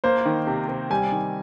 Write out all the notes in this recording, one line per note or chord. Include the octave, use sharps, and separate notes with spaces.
A#3 C5
D#3
C3
C3
G3 G#5
D#3